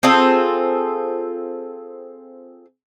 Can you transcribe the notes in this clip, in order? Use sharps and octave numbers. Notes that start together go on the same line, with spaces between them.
C4 F4 G#4 A4